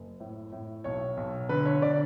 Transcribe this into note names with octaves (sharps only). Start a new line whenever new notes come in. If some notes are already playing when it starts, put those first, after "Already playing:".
Already playing: F#1
A2
A2
B1 C#5
B1
D3 B4
C#5
D3 D5